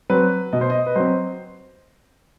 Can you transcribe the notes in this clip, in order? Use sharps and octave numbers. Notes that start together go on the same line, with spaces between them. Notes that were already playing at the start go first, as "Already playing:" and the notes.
F#3 C4 B4
B2 D#5
C5
D#5
B4
F#3 C4 C5